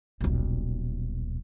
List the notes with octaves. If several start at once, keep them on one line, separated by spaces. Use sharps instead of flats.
D#1 B1